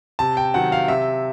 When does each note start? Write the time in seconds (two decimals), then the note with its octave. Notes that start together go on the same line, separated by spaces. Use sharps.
0.19 C3 A5
0.37 G5
0.54 D#3 F#3 F#5
0.72 F5
0.88 C3 E5